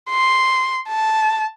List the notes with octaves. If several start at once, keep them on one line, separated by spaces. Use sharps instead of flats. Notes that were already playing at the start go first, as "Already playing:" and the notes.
C6
A5